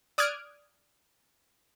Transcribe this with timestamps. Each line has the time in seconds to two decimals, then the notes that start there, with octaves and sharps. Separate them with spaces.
0.18 D5 D#6 F6 F#6 G#6 D7